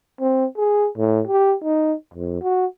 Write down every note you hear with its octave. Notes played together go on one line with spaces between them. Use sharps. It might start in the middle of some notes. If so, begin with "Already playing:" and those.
C4
G#4
A2
G4
D#4
F2
F#4